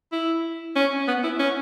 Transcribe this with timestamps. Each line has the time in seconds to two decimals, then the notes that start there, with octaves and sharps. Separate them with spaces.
0.12 E4
0.76 C#4
1.08 B3
1.24 E4
1.40 C#4